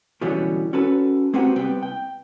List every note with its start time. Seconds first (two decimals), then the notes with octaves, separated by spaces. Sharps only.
0.21 B2 D3 E3 F#3 G3 C#4
0.73 C#4 F#4 A4 B4
1.34 A#3 C4 F#4 G4 B4 F#5
1.55 C2 C3 G3 B3 G5
1.83 G5